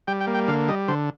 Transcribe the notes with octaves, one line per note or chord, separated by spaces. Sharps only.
G3 G5
G5
A#3
G5
D3 F5
G3 D#5
D3 C5